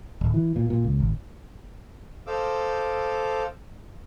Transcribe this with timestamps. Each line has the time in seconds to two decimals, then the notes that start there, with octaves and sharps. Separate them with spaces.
0.21 D1
0.34 E3
0.56 A#2
0.70 A#2
0.84 C#2
1.00 G#1
2.27 A4 C5 D#5 F5 D6 E6